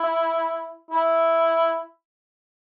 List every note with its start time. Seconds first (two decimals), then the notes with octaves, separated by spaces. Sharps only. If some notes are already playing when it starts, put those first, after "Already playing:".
Already playing: E4
0.91 E4